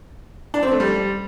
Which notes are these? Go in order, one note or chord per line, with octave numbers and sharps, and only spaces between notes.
D4
C4
A3
G3